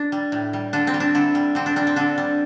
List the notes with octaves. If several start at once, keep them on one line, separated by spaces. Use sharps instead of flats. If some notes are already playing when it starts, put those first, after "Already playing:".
Already playing: D4
G3
A2
G3
D3 D4
C4
G3
D4
D3 E4
G3
D3 C4
D4
G3 D4
C4
D3 D4
G3